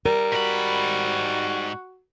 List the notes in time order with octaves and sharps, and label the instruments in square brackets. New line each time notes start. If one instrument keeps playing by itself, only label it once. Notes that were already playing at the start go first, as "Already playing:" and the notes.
[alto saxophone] G3 [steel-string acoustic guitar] A#4
[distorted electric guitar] G#2 B5 [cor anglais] F#4